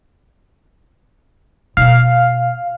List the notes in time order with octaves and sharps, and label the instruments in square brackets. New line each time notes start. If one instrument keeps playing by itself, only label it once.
[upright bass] B2 C4 [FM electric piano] F5